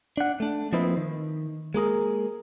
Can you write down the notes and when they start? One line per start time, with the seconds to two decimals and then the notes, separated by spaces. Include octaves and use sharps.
0.18 D4 F#5
0.40 A3 D4
0.73 F3 A#3 C4 D#4 E4 B4
0.97 D#3
1.74 G#3 A#3 G#4 A#4